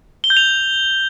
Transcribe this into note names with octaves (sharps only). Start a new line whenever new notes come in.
G7
G6
F7